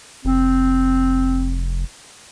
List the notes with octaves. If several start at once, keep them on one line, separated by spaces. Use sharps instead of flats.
F1 C4